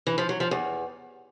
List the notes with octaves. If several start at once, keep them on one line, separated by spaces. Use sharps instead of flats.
E3
F3
F#3
F3
E2